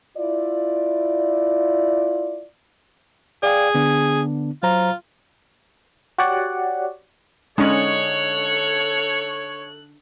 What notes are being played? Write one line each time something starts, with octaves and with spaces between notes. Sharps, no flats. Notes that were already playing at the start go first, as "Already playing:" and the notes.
E4 F4 D5
G#4 D5 F5 G5
D3 B3 D4
F#3 F4 C5 A#5
F#4 G4 C#5 D5 F#5
D3 G#3 C#4 D#4 A4 C#5 F#6